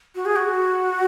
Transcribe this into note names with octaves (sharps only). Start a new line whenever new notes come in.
F#4
G#4
F#4